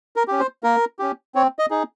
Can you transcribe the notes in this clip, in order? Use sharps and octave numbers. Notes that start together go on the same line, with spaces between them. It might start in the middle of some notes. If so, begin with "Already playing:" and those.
A#4
C#4 G4
C5
A#3 A#4
C#4 G4
C4 C#5
D#5
D#4 G#4